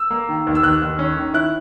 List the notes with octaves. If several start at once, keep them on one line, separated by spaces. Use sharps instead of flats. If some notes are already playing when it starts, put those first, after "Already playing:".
Already playing: E6
A#3
D#3
D#2
E6
D#2 F#6
D#2
C#4
D#3
E4 F#6